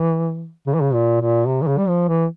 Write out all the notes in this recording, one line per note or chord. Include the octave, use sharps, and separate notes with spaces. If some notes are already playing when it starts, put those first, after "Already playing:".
Already playing: E3
C#3
E3
C#3
A#2
A#2
C3
E3
C#3
G3
F3
E3